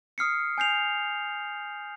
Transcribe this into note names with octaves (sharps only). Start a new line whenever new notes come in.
D#6 F6 C7 C#7
G#5 G6 C7 F7